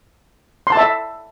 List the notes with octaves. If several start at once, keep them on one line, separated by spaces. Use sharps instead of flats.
C6
A5
E5